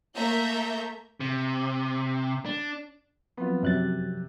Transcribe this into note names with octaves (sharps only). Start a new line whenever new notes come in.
A3 A#3 E5 A#5 G6
C3
D4
F3 F#3 B3 C4 F4
F#2 C3 F#6 A6